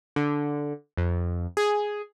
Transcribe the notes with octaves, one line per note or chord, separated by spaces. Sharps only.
D3
F2
G#4